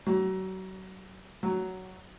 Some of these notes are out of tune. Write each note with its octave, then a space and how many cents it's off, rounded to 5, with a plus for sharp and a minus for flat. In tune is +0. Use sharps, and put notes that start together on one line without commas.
F#3 +30
F#3 +10